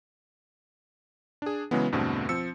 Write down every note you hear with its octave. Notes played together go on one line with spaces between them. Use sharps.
D4 G#4
C#3 E3 F#3 G#3 B3
E2 G2 B2 D3 A3 C4
F3 C4 E6 C#7